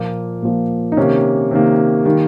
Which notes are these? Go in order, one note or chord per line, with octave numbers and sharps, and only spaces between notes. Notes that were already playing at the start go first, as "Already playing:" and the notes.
Already playing: A#2 F3 A#3
A#2 F3 A#3
D#4
C3 D#3 A#3 C#4
C3 D#3 A#3
D#3 G3 A#3